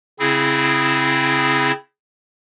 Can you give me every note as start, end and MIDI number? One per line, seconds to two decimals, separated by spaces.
0.19 1.72 49
0.19 1.72 60
0.19 1.72 64
0.19 1.72 68